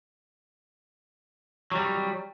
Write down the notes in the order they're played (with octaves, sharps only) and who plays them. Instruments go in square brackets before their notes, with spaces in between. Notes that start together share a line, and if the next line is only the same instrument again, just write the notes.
[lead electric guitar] F#3 G3